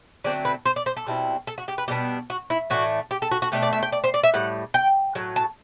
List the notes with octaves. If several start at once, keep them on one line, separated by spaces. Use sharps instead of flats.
D3 F#3 A3 C4 D5
B4
C5
D5
C5
A4
B2 G3 C4 E4
A4
F#4
G4
B4
B2 G3 B3 D4 G4
F#4
E4
A2 E3 A3 D4 F#4
G4
A4
F#4
F#4
B2 A3 D4 G4
D5
E5
G5
D5
C5
D5
E5
A2 G3 F#5
G5
A2 F#3
A5